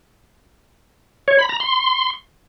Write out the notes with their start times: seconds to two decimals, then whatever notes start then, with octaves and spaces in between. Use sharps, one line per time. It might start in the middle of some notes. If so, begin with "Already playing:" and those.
1.28 C#5
1.39 B5
1.49 A#5
1.60 C6